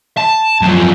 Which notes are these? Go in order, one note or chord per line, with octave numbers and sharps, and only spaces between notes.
A5
F#2 F3